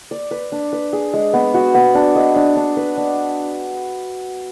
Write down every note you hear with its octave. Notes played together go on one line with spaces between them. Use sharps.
D5
B4
D4
B4
G#4
G#3
B3
F#4
B3
D4
D#5
D4
D4
B4
D4